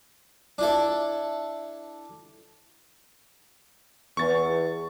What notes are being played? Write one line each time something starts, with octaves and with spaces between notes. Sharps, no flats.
D4 E4 A4
E2 C#6 A6